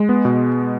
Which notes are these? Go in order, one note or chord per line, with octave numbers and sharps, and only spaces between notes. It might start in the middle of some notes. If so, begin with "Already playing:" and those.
Already playing: G#3
B3
B2